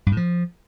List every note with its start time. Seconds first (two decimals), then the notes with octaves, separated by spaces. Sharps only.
0.06 G2
0.12 A2
0.17 F3